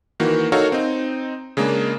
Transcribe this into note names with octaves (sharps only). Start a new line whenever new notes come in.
D#3 E3 A#3 F#4
D#4 F#4 A4 A#4 C#5 F5
C4 D#4
C#3 G#3 A#3 D4